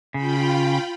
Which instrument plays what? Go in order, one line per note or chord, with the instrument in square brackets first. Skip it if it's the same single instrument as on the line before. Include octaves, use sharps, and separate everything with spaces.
[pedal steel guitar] C#3 [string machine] F4 G5 B5